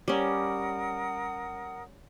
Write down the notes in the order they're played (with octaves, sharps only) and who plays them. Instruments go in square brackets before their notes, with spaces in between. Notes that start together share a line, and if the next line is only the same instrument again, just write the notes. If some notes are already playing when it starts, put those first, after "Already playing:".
[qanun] G3 C#4 [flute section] A#4 F#5 D#6